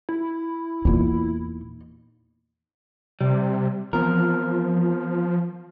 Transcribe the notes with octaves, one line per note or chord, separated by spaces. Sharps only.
E4
E2 A#2 D#4
C3 G3
E3 F3 B3 C4 A#4